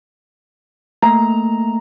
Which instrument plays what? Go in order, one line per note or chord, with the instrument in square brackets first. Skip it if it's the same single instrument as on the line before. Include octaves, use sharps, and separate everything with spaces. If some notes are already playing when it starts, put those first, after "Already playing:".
[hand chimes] A3 A#3 [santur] A#5